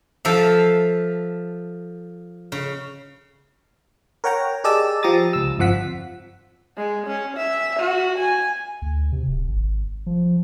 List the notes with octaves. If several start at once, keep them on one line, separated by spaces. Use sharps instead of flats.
F3 A4 E5 F5
C#3
A#4 C#5 F#5 G5 A#5
G4 G#4 D5 D#5 A5 E6
F3 G4 A#5 D#6 A6
C#2 E6
G1 F2 F3 F#5 B6
G#3
C#4
E5
F#4
G#5
D2
C3
D1
G#1
F3